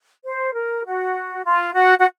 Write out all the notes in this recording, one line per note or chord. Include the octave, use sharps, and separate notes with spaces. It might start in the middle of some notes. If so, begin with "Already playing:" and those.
C5
A#4
F#4
F4
F#4
F#4